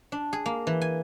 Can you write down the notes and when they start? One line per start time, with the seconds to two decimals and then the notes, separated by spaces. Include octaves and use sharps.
0.12 D4
0.33 G#4
0.46 A#3
0.67 E3
0.81 G#5